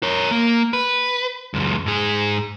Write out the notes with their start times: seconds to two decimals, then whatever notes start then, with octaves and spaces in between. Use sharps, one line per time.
0.03 A#4 C#5
0.31 A#3
0.73 B4
1.54 C#2 F#2
1.86 G#2 G#4